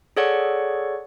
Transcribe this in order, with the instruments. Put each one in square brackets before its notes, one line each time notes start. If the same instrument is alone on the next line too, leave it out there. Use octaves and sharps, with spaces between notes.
[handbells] G#4 A4 C#5 D5 F#5 C#6